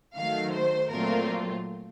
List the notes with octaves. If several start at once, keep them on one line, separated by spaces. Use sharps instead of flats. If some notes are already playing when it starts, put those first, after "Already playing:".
D#3 F#3 A3 F5
C5
A#2 F#3 A3 C4 F4 A#4